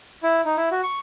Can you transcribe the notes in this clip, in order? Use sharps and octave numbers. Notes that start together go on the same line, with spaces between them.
E4
D#4
E4
F#4
C#6